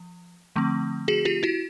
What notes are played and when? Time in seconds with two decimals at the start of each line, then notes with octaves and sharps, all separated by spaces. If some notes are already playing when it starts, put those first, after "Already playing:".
Already playing: F3
0.56 D3 F3 A3 C4
1.08 F#4 G#4
1.25 F4 G4
1.43 E4 F#4